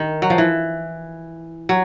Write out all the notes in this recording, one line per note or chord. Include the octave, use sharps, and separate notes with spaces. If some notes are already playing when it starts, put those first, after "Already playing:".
Already playing: D#3
F#3
F3
E3
F#3